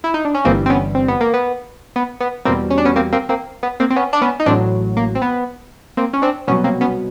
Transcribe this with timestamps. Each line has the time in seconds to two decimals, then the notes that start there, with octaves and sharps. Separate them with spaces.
0.04 E4
0.14 D#4
0.25 D4
0.34 C#4
0.45 G1 G2 E3 G3 A#3 C4
0.66 C4
0.70 B3 C#4
0.95 C4
1.08 B3
1.21 A#3
1.34 B3
1.96 B3
2.20 B3
2.45 E2 B2 G3 A#3 C4
2.70 C#4
2.78 D4
2.85 B3 C#4
2.96 A#3 C4
3.12 A#3 C4
3.29 A#3 C4
3.63 B3
3.80 A#3 C4
3.90 C4
3.96 B3 C#4
4.13 D4
4.22 B3 C#4
4.40 D#4
4.46 A1 A2 F#3 C4 D4
4.97 A#3
5.15 C4
5.22 B3
5.97 A#3 C4
6.13 C#4
6.22 C4 D4
6.47 C2 B2 F#3 B3 C#4
6.64 A#3 C4
6.81 B3 C#4